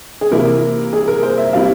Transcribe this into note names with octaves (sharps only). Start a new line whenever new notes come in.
G#4
C3 E3 A#3 E4 A#4
G#4
A#4
C5
E5
G3 C4 E4 F5